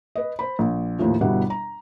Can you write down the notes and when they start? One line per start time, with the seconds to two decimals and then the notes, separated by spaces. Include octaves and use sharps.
0.15 B4 D#5
0.39 C5 B5
0.59 A#1
0.99 D#2 A2 F3
1.21 G1 B2 G3 E4 F#5
1.50 A#5